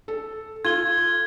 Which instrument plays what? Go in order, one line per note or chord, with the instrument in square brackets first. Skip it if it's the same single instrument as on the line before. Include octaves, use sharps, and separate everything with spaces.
[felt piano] A4
[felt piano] F4 A4 [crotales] G#6 G7